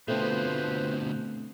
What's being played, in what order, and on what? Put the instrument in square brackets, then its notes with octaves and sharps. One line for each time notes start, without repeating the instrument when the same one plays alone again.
[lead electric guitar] B2 D3 [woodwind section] F3 B4 C5 [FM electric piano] A3 C4